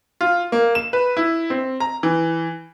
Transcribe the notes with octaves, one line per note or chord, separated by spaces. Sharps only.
F4
A#3
E7
B4
E4
C4
A#5
E3